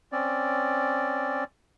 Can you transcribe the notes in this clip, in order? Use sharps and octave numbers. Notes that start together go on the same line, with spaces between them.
C4 C#4 D5